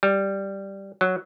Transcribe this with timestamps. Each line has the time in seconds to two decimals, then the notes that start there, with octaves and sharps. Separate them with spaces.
0.03 G3
1.01 F#3